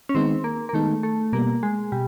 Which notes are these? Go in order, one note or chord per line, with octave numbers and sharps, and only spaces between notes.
C#4
D#3 G#3 B3 C4 D#4
A#3
A#3
D#3 G#3 A3 B3 D#4
A3
B2 G3 A#3 B3
G#3
B2 G3